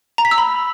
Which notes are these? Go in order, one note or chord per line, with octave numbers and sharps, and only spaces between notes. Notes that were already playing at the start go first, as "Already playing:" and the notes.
A#5
B6
E6
B5